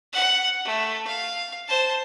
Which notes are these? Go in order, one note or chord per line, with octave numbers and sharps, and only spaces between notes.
F#5
A3
F5
C5 A5